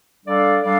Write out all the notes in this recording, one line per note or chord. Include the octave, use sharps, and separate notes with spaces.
G3 D4 A4 D5 F5
G3 D4 A4 D5 F5